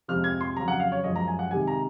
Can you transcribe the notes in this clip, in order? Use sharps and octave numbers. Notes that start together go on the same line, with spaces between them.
F2 C3 F3 G#3 F6
G#6
C6
F2 C#3 F#3 A#5
F#5
F5
C#5
F#2 F3 G#3 D#5
A#5
G#5
F#5
C3 D#3 G#3 G#5
A#5